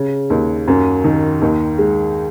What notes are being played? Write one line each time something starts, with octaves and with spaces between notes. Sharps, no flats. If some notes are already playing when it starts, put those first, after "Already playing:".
Already playing: C#3
D#2
F#2
D#3
D#2
G#3